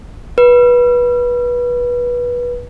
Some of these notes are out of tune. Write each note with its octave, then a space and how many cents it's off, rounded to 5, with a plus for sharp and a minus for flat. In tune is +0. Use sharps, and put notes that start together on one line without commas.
B4 -20